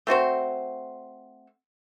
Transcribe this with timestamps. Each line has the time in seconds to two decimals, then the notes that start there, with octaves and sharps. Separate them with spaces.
0.07 A3 C4 F#4 C5